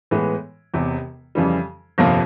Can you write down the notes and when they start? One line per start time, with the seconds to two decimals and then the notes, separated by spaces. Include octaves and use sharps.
0.11 A2 E3 G#3 B3
0.74 E1 E2 C3
1.35 F2 C#3 E3 G3
1.98 G1 F2 C3 F3 A#3